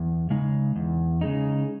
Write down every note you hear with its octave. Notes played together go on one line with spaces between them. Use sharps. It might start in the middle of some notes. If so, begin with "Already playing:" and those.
Already playing: E2
C#3 G#3 D#4
E2
C#3 G#3 D#4